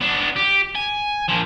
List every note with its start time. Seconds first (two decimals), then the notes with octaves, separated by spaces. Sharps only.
0.01 B3 D4
0.36 G4
0.75 G#5
1.29 A#2 F3